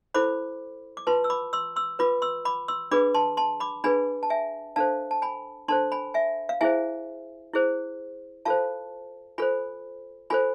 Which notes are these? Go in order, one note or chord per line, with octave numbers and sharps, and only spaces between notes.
E4 A4 C5 B5 D6
D6
F4 B4 A5 C6
E6
B5 D6
C6 E6
C6 E6
F4 B4 B5 D6
C6 E6
B5 D6
C6 E6
D4 G#4 B4 B5 D6
A5 C6
A5 C6
B5 D6
D4 G#4 B4 G#5 B5
A5
E5 G#5
D4 A4 C5 F5 A5
A5
G#5 B5
D4 A4 C5 A5 C6
G#5 B5
E5 G#5
F5
E4 G#4 C5 E5 G#5
E4 G#4 C5
F4 A4 C5 F5 A5
F4 A4 C5 G#5 B5
F4 A4 C5 G#5 B5